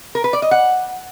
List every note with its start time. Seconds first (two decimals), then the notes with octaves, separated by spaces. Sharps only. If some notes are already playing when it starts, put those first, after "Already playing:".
0.15 A#4
0.24 B4
0.33 D5
0.42 D#5
0.51 F#5